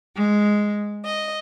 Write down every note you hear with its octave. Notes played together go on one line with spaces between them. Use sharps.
G#3
D#5